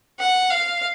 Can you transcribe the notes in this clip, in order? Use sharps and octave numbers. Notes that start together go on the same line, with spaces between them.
F#5
F5